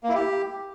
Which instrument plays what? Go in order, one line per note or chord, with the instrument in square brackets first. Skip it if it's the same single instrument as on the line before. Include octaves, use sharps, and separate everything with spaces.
[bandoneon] A#3
E4
G4